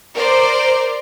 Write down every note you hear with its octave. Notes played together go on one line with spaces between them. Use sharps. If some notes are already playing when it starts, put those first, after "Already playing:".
A#4 C5 D5